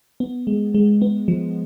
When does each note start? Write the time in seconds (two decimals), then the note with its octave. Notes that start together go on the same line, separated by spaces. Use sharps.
0.20 B3
0.47 G#3
0.75 G#3
1.02 B3
1.28 F3